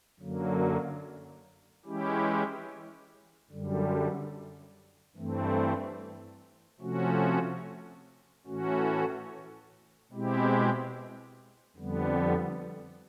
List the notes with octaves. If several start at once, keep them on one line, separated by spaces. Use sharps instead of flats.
F#2 D3 F#3 A#3
E3 G#3 C#4 E4 G4
F#2 D3 G3
G2 E3 A3 C4
C3 F3 A3 C#4 F#4
A2 E3 A3 C#4 F#4
B2 G#3 C4 E4 G4
F2 D3 G3 B3